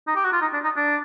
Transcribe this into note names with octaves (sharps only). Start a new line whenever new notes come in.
D#4
G4
F#4
F4
D#4
D4
D#4
D4